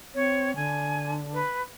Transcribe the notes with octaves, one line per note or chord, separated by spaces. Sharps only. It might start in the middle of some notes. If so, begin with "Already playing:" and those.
C4 C#5
D3 G#5
B4